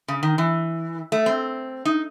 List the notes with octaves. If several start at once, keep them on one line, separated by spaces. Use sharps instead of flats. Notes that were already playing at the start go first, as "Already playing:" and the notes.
C#3
D#3
E3
A3
C4
D#4